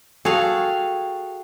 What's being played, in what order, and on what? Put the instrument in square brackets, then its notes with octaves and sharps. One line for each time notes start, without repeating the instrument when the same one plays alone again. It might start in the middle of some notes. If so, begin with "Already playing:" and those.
[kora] F#4 A4 [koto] G#4 F5 [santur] G5